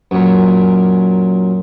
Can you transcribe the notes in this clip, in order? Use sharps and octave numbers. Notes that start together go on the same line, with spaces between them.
F#2 A#2